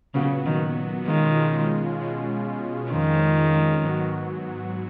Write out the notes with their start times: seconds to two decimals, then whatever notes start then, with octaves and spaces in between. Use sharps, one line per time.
0.14 A#2 C#3 F#3 B3 F#4
0.46 D#3
1.07 B2 D#3 G#3 C#4 F4
1.99 B2 G#3 C#4 F4
2.91 F2 D#3 F3 G#3 C#4 F4
3.84 G#2 F#3 B3 F#4